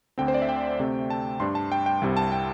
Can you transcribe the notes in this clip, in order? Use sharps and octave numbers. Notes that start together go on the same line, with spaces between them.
D2 D3 C4 G5
C5
D5
E5
G5
C3 A3 C4
A5
G2 G3 D4 C6
A5
G5
G5
C2 C3 G3 C4
A5
G5